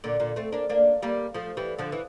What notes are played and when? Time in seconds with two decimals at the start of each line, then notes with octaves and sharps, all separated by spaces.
0.04 A#2 D3
0.20 A#2 D3
0.36 A3 C4
0.52 A#3 D4
0.70 A#3 D4
1.02 G3 A#3
1.34 F3 A3
1.57 E3 G3
1.78 D3 F3
1.92 E3